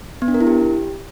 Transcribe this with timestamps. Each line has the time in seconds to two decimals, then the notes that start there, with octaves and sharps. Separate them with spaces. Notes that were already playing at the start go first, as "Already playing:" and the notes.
0.22 B3
0.28 D4
0.34 A#4
0.41 E4
0.47 G4